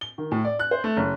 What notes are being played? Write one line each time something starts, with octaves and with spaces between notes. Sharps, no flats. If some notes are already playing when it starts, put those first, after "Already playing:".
G7
D#3
A2
D5
F#6
C5
A3
F#1